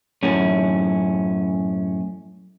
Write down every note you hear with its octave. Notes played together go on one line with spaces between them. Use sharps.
F#2 A2 C#4